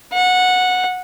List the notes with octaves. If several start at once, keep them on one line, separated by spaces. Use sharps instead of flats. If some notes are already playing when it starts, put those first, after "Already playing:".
F#5